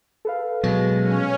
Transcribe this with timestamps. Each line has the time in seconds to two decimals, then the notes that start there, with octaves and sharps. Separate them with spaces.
0.25 A4 B4 F5
0.64 B2 F#3 G#3
0.98 C#4